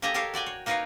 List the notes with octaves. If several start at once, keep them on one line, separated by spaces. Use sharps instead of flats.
A#3 G4 A4 D#5 G#5 A#5
G4 A4 A#4 C#5 F5
F#4 D5 G5 G#5
C#5
A#3 D#4 A#4 B4 C#5 F5